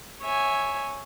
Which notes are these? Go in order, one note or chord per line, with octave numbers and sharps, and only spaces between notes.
C#5 E5 G#5